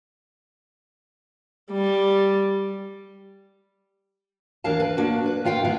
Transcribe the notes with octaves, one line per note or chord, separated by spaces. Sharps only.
G3
D#2 E3 D4 A#4 F5 A5
B4
A#3 D4 F#4
B4
D#3 F4 F5 G5
D3 A3 B3 E4